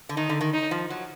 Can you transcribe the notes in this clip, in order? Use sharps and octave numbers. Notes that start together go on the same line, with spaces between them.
D3
D#3 D#4
D3
D#3
D#4
F3
F#3